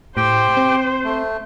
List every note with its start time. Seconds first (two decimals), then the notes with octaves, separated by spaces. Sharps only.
0.17 A2 G4 C5 G5
0.57 C4
1.04 A3